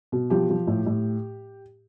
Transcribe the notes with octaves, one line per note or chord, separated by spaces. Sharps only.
B2
F3 G4
F3
A2
A2